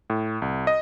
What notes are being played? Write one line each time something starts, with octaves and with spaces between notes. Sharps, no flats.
A2
C2
D#5